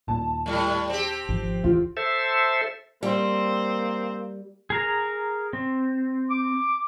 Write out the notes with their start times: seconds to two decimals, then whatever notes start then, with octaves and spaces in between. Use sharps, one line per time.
0.08 D#2 A#2 A5
0.46 A2 G3
0.90 C4 G4
1.29 G#1 F3
1.64 E2 F4
1.97 A4 C5 E5
3.03 G3 A#3 C4 C5
4.70 G#4 A#4 A#5
5.53 C4
6.30 D6